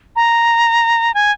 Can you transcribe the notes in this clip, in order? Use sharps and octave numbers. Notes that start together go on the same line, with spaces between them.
A#5
G#5